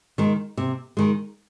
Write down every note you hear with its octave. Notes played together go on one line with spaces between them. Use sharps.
D#3 G#3
C3
D#3 G#3